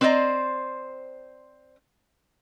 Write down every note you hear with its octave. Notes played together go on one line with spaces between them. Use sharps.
C4 B4 C5 D5 D#5 A#5